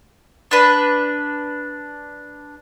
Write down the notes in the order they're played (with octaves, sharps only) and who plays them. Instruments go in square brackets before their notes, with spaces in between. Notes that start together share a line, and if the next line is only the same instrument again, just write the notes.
[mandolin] D4 B4